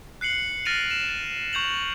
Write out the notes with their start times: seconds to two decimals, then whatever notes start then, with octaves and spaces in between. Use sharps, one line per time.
0.21 F#6 C7 C#7 F#7
0.65 F6 A6 A#6 D7 D#7 F7
0.91 E7
1.09 A6
1.53 C#6 G6 F7 F#7